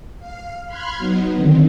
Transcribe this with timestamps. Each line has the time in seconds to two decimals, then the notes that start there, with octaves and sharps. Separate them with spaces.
0.20 F5
0.66 B5 C6 F6 F#6 G#6
0.97 F#3 B3 D#4
1.37 D3 D#3 C4